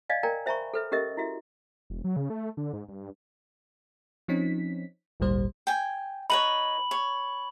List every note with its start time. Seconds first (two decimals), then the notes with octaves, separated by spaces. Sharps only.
0.09 D5 D#5 F5 G#5
0.23 A#4 D5 G5 G#5 A#5
0.46 C5 E5 G#5 A#5 B5 C#6
0.74 A4 B4 E5
0.92 C#4 G4 A#4 D#5 E5 D#6
1.17 E4 F#4 E5
1.90 E1
2.04 F#3
2.16 C#3
2.30 A3
2.57 D3
2.73 G#2
2.88 G2
4.28 F3 C4 C#4 D#4 B6
5.20 G#1 D2 A#2 G3 C5
5.67 G5 G#5
6.30 D#4 B4 C#5 B5 F#7
6.91 C#5